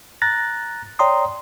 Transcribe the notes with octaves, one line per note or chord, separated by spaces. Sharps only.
A#5 F#6 A6 A#6
C#5 D5 G5 A#5 C6 D#6